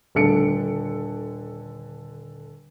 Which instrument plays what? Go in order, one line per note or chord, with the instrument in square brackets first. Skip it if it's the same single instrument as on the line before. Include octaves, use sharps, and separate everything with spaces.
[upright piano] D#1 D3 A4 C#7 D7